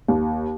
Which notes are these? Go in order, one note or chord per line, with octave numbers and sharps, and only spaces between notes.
D#2